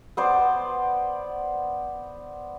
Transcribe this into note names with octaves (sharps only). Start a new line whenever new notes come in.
B3 C5 D5